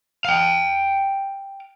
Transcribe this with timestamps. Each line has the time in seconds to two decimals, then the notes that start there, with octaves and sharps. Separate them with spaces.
0.25 F5 G5